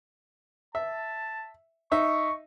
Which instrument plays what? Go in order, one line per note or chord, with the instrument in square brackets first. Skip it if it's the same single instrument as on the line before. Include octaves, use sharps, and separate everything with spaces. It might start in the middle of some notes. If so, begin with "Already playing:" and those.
[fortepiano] E5 [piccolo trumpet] A5
[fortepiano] D#4 E5 [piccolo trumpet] C#6